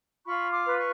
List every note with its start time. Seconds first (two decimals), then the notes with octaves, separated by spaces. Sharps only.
0.24 F4 B5 C#6
0.51 C6 D6
0.65 B4
0.78 C#6